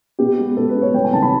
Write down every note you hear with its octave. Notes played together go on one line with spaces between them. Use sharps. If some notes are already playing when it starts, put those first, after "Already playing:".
B2 G4
G#3 B3
B2 A4
B4
G#3 B3
C#5
C2 G5
G#5
C3 D#3 F#3 A5
B5